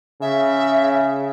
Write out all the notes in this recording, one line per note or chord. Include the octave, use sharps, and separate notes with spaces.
C#3 E5